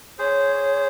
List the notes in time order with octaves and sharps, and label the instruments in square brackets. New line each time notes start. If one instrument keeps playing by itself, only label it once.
[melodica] G#4 C5 [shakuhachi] C#5